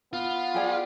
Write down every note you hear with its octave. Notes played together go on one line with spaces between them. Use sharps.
B3 F4
G4 G#4 D5